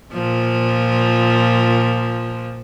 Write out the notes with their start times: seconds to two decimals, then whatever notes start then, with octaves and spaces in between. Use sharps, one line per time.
0.13 A#2 F3